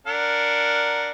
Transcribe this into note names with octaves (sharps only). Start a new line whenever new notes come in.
D4 A#4 F#5